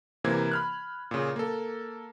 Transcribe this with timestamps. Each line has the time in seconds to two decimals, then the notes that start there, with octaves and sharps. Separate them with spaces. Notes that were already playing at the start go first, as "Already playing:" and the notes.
0.24 C3 E3 A#3 C5 G#6
0.51 B5 F6 F#6
1.11 A#2 C#3
1.36 A#3 A4